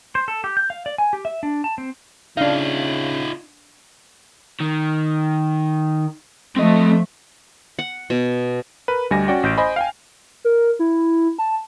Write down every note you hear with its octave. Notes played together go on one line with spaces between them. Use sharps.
C5
A4
G4
G6
F5
D5
G#5
G4
E5
D4
A5
C4
C#3 D4 D#4 F4 F5
D#3
F3 A3 C4 D#5
F#5
B2
A#4 B4
D2 G3 D#5 G#5 A#6
C#4 F#4 D5 G5
A1 G6 D7
C5 D#5 G#5 B5
F5 G5 G#5
A#4
E4
A5